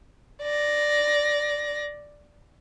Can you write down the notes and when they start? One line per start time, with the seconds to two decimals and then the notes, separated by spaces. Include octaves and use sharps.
0.42 D5 A#6